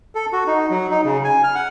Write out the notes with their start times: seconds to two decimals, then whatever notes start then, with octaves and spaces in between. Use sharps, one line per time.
0.15 A4
0.33 F#4
0.47 D#4
0.70 F#3
0.91 D#4
1.05 C#3
1.25 G#5
1.44 F6
1.55 F#5